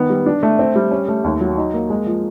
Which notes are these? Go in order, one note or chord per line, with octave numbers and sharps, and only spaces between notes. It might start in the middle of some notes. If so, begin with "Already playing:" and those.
Already playing: D#3 B3
G3
D4
A3
C4
G3
C#4
A3
D#2
F#3
D#4
A#3
G#3
F3